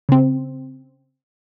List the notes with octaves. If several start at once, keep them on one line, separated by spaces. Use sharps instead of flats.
C#3 C4